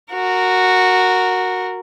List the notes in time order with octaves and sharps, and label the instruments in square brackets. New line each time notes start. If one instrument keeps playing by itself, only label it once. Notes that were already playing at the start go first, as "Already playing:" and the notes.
[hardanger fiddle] F#4 A#4